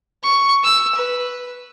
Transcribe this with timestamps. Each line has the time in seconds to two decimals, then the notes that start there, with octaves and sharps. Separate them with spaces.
0.23 C#6
0.64 E6
0.95 B4